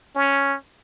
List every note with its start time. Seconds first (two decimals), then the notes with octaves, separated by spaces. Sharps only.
0.16 C#4